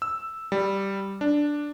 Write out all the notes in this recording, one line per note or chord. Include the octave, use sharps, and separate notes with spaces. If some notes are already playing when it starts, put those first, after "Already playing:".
E6
G3
D4